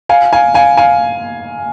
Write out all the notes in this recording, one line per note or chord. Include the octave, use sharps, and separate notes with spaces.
F5 G#5
F5 G#5
F5 G#5
F5 G#5